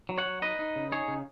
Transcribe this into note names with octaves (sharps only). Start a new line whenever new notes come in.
F#3
C#5 F#5
F#3
D#4 B4 D#5
D#4
C#3
D#4 G#4 C#5
C#3